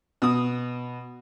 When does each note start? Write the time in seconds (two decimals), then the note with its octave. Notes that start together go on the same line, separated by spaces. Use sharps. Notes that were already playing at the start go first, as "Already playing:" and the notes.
0.22 B2 D#6